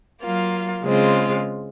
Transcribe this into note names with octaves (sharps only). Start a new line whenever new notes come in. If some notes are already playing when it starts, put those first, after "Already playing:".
F#3 A#3 F4
C#3 G#3 C4 F4